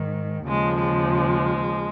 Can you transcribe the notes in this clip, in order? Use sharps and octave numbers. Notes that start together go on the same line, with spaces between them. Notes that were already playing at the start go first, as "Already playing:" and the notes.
Already playing: G#2 D#3
D#2 C#3 F3 G#3
G#3